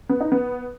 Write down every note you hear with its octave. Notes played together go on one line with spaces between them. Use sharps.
B3
D#4
B3